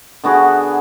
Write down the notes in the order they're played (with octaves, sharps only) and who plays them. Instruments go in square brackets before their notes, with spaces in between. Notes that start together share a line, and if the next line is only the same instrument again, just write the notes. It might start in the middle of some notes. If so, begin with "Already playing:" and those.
[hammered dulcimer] D3 B3 F#4 G#4